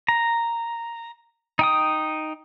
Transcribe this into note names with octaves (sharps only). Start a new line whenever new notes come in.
A#5
D#4 G5 D#6